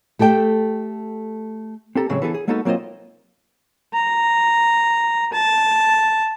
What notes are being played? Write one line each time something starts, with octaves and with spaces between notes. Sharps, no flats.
A3 G4 A4 G5
C4 G4 A4 A#5
A2 C#3 F#3 G#3 C4
E3 B3 G#4 A4
G#4
G#3 A#3 B3 D#4 F#4 A4
F#3 A#3 C4 F4 C5 D#5
A#5
A5